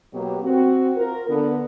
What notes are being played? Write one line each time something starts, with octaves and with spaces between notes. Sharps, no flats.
B2 F#3 A#3 G4
C4 F#4
F4 A#4
D3 B3